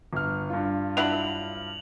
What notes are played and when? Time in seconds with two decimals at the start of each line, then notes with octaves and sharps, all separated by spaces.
0.13 G1 F6
0.50 G2 F4
0.97 F#3 D4 E4 F7 F#7